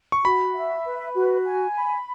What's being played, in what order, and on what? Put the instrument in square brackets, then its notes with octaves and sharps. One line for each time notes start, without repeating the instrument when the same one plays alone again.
[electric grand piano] C#6
[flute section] F#4 [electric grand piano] B5
[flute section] E5
B4
F#4
G#5
B5